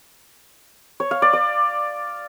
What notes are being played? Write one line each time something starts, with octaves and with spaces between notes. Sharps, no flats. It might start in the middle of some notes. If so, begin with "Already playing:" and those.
C#5
F5
D5
D5